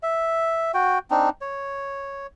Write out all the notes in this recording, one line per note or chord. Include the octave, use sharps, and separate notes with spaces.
E5
F#4 G5
C4 D4 D#4
C#5